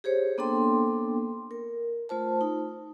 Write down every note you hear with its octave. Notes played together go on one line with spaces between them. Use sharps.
G4 G#4 C5 C#5
A#3 B3 D4 A4 G5 C6
A#4
A3 F4 C5 A5
D#4